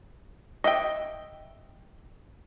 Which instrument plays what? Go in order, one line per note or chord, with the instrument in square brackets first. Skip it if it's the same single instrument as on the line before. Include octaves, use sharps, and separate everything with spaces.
[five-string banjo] D#5 E5 F#5 G5